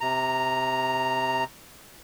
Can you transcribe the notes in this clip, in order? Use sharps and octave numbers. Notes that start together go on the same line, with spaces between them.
C3 A#5